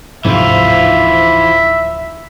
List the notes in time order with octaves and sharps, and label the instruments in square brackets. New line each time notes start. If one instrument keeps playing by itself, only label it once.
[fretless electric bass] D1 F2 C3 [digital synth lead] G#2 [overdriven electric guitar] E3 F4 [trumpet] E5